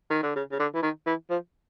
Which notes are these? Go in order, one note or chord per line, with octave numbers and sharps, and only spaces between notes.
D#3
D3
C#3
C#3
D3
E3
D#3
E3
F3